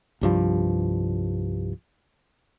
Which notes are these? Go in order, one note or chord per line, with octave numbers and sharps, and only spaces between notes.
C2 G2 F3